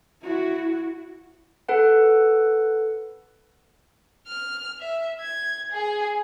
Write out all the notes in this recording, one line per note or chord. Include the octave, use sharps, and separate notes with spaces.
E4 F#4
A4 B4 F#5
F6
E5
G#6
G#4 G#5